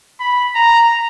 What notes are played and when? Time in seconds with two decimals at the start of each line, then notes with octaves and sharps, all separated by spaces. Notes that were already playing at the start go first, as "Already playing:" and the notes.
0.20 B5
0.55 A#5